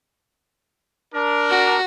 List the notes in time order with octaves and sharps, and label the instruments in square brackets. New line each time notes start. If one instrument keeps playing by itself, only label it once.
[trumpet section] D4 A#4
[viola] F#4